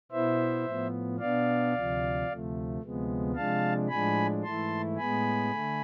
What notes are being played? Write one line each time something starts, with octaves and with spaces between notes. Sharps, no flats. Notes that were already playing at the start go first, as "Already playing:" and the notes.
B2 B3 E4 C5 E5
A2 F3 B3
B2 B3 D4 D5 F5
D2 C3 F3
D2 C3 F3 A3
D2 C3 F3 G#3 B3
C3 F3 G#3 D4 F5 A5
A2 F3 G#3 D4 G#5 B5
G#2 E3 A3 E4 A5 C6
A2 G#3 B3 G#5 B5
D3 A3